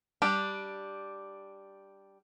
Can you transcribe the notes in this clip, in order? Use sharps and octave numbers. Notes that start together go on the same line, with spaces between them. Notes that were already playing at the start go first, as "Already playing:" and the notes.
G3 D4 G4